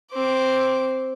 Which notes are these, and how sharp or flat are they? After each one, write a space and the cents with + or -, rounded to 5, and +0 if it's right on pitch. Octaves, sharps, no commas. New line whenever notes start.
C4 +0 D6 -15